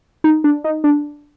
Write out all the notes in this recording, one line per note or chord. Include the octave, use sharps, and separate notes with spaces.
D#4
D4
D#4
D4